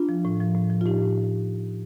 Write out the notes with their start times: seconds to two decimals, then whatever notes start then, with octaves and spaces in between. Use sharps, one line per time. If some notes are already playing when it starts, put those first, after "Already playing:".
Already playing: D4 F4
0.09 F3
0.25 A2
0.40 F3
0.55 A2
0.70 F3
0.81 F4
0.86 A2 D#4 G4
1.02 A2